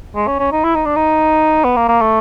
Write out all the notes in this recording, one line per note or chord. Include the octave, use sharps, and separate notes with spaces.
G#3
C#4
C#4
D#4
E4
D#4
D4
D#4
B3
A#3
A#3
A3